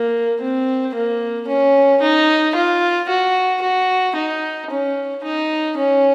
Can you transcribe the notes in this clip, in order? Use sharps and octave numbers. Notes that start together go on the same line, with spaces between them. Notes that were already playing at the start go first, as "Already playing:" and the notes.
Already playing: A#3
C4
A#3
C#4
D#4
F4
F#4
F#4
D#4
C#4
D#4
C#4